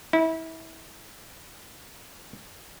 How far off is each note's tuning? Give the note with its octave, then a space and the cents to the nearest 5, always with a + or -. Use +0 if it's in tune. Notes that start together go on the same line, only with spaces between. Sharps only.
E4 -30